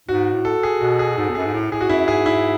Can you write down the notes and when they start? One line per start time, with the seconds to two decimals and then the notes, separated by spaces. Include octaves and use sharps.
0.09 G#2 F#4
0.33 A2
0.45 A4
0.63 G#4
0.81 B2 F#4
0.99 G#4
1.17 G#2 A4
1.30 E2
1.35 F#2 G#4
1.45 G#2
1.53 A2
1.72 A2 G#4
1.81 F#4
1.89 F#2 E4
2.07 G#2 G#4
2.26 E4